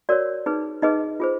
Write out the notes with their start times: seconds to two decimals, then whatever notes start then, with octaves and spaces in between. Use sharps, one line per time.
0.09 F#4 A#4 C#5 D5
0.46 D#4 G#4 B4
0.82 D#4 G#4 B4 D#5
1.20 F4 G#4 C5